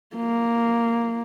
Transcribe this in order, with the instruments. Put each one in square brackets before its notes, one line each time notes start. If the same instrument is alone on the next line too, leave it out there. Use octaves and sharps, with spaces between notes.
[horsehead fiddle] A#3